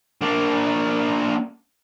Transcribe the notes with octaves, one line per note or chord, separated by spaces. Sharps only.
A#3 D4